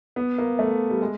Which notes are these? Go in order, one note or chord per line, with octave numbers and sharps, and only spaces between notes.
B3
A#3
A3
G3
G#3